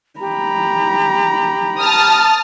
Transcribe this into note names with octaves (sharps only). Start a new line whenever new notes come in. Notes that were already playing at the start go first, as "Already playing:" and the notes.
G4 A#5 B5
A5 D#6 F6